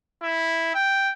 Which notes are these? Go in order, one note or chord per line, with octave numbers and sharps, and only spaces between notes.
E4
G5